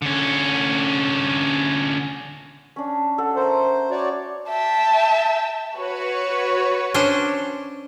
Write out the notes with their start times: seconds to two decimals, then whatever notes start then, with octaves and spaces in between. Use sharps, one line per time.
0.02 D3 C#4
2.76 C#4 D4
3.18 A4 F#5
3.36 A#4 C5 E5
3.91 F#4 C#5 D5
4.49 E5 G5 A5
5.76 F#4 B4 C#5
6.94 C#4 D4 C5